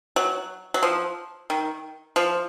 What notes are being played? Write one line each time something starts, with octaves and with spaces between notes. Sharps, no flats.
F#3
F#3
F3
D#3
F3